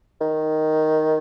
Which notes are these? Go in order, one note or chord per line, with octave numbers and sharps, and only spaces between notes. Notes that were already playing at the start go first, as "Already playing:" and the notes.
D#3